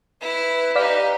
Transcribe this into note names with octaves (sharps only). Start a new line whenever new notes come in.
E4 B4
D#4 G4 D5 F5 B6